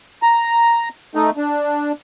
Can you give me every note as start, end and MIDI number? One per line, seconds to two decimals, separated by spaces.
0.22 0.88 82
1.15 1.30 57
1.15 1.30 63
1.37 1.92 62